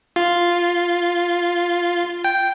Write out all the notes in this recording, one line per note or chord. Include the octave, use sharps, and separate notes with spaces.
F4
G5